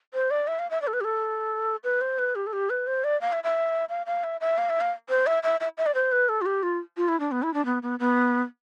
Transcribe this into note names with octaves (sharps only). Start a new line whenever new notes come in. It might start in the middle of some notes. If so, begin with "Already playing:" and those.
C5
D5
E5
F5
E5
D5
A4
B4
G4
A4
B4
C5
B4
G4
A4
G4
B4
C5
D5
F5
E5
E5
F5
F5
E5
E5
F5
E5
F5
C5
E5
E5
E5
E5
D5
C5
B4
A4
F4
G4
F4
F4
E4
D4
B3
E4
D4
B3
B3
B3